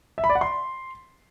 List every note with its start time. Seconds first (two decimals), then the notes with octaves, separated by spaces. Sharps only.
0.18 E5
0.24 B5
0.30 D5
0.35 F#5
0.41 C6